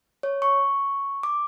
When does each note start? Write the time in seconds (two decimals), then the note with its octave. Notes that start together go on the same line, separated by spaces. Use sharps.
0.23 C#5
0.42 C#6
1.23 D6